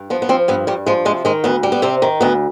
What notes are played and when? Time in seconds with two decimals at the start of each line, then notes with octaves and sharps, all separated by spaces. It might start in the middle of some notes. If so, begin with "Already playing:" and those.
Already playing: G2
0.10 F3 B3
0.22 B3
0.29 F3 C4
0.48 G2 B3
0.67 G2 G3
0.86 F3 G#3
1.05 C3 G#3
1.25 D#3 G#3
1.44 D2 B3
1.63 G3
1.72 B3
1.82 C3 C4
2.02 D#3
2.21 D2 B3